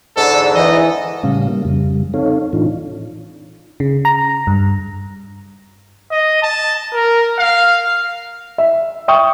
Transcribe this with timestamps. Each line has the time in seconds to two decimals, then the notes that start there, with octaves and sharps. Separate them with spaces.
0.17 E2 G#2 D3 A4
0.54 E3 D#5
1.23 A2 C#3 G3 C#4 F5
1.48 G3 A#3
1.65 F2 C#3 G3
2.14 C4 D#4 A4 C#5 F5
2.53 A2 E3 D4 D#4 F4
3.80 C#3
4.05 A#5
4.47 G2
6.11 D#5
6.43 A5
6.94 A#4
7.39 F5
8.58 E5
9.08 E5 G5 C#6 D#6